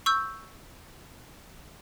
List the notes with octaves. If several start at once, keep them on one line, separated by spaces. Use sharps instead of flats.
C#6 E6 G6